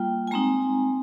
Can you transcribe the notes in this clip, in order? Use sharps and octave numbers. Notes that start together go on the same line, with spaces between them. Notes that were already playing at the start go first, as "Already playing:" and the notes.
Already playing: G3 A#3 F4 G5
G#5
G#3 C4 D#4 A#5